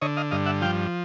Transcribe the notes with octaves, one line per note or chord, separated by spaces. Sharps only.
D3 C#5 D#5
D#5 F5
G2 D#5 F5
E5 F#5
F3 F5 G5